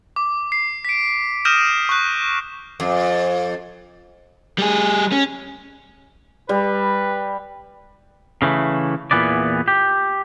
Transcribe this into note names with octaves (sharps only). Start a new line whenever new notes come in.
D6
C7
B6 D7
D#6 F6 G6 A#6 D#7 E7
C#6 F#6
F2
G3 G#4
C#4
G3 B4
C#3 E3 A3
E2 A#2 E3 B3 D5
G4